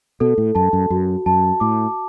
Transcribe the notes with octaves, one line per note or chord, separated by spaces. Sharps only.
B2 A4
A2
F#2 A5
F#2
F#2 F#4
F#2 A5
A2 D6